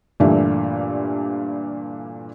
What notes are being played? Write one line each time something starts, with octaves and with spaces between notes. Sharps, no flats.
G2 A#2 D3 E3 G3 A3